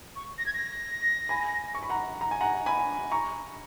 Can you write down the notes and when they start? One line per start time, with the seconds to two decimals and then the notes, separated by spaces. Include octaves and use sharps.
0.16 C#6
0.38 A#6
0.46 G#6
0.53 A#6
1.29 G#5 B5
1.75 C#6
1.83 B5
1.90 F#5 A#5
2.21 A#5
2.31 G#5
2.41 F#5 A#5
2.66 G#5 B5
3.11 A#5 C#6